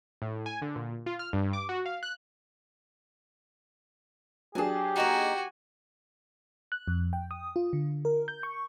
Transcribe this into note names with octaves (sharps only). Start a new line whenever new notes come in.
A2
G#5
D3
A#2
F4
F6
G2
D6
F#4
F5
F#6
F#3 D4 G4 G#4 G#5 A5
A#3 D#4 F#4 G#5 A#5
F#6
F2
G5
D#6
F4
D3
A#4
G6
C#6